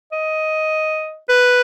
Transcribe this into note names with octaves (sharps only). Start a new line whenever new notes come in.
D#5
B4